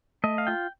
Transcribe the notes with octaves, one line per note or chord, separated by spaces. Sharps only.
A3 D#5
F5
F4 G5